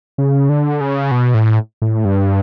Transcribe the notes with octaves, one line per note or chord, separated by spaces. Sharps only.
C#3
D3
C#3
B2
A2
A2
G2